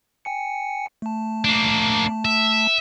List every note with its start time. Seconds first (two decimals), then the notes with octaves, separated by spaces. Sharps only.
0.25 G5 G#5 C#7
1.02 A3 A5
1.44 A#3 D4
2.25 E5